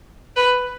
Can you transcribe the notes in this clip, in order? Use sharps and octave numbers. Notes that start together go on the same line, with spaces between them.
B4